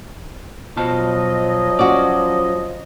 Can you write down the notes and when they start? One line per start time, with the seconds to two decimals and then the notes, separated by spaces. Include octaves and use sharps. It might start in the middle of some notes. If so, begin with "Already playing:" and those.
0.77 B2 F3 F#3 F4 D#5 A5
1.79 C#4 F#4 D5